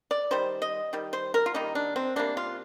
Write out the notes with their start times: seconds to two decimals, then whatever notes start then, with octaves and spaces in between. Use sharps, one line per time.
0.11 D5
0.31 D#3 G3 C5
0.62 D#5
0.93 D#3 G3
1.13 C5
1.34 A#4
1.46 F4
1.54 D#3 G3 A#3 D#4
1.75 D4
1.96 C4
2.16 C3 G3 A#3 D4
2.37 F4